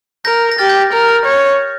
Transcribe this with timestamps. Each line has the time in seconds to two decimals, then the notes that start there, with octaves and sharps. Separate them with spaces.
0.25 A#4 G6 A#6
0.51 A#6
0.58 G4 F6 A6
0.69 G6
0.81 G6
0.92 A#4 F6
1.09 F6
1.25 C#5